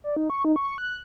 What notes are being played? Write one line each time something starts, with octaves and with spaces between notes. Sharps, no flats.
D5
D#4
C#6
D#4
C#6
F#6